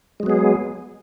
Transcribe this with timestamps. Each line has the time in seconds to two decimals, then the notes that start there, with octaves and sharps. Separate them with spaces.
0.20 G#3
0.23 F#3
0.26 B3
0.30 G#4